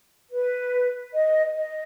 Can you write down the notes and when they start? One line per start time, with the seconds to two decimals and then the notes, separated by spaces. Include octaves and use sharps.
0.31 B4
1.13 D#5
1.53 D#5